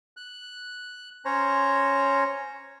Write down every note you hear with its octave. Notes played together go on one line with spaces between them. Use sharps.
F#6
C#4 C5 C#5 A#5